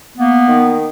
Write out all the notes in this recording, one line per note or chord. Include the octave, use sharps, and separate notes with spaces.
A#3 B3
D#3